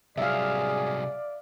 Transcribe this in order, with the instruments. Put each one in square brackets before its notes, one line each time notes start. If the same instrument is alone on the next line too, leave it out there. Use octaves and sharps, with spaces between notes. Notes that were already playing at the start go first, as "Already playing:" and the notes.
[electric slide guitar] C3 F#3 G3 [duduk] G#4 [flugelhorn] D5 [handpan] E5 F5